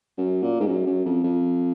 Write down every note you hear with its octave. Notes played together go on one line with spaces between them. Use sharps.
F#2
A#2
G#2
F#2
F#2
F2
F2